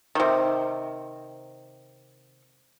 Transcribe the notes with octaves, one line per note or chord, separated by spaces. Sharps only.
C3 D#3